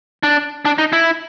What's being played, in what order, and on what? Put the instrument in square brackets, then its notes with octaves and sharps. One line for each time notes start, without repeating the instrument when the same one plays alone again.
[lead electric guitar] D4
D4
D#4
E4